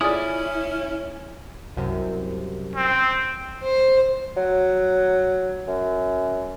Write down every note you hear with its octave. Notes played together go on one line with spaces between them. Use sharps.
C#4 E4 F4 G#4 D5 G#5 D#6
C2 F#2 C3
C4
C5
F#3
F#2